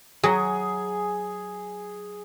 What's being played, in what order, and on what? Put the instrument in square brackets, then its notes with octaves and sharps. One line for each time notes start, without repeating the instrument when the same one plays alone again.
[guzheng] F#3 [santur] G#4